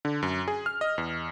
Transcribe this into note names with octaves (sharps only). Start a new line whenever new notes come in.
D3
F#2
G#4
F6
D#5
E2